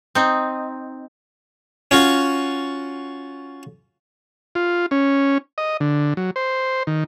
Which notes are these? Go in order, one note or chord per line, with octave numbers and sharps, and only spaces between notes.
C4 D#4
C#4 F4 F#4
F4
C#4
D#5
D3
F#3
C5
D#3